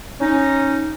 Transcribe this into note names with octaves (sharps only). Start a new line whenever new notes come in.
C#4 D#4